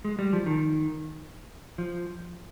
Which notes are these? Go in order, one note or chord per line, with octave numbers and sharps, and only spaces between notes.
G#3
G3
F3
D#3
F3